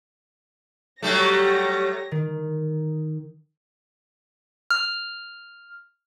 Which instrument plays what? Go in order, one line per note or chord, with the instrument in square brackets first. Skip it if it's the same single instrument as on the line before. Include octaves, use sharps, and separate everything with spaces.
[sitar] F#3 G3 A3 [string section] G4 C#5 A#6
[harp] D#3
[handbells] F6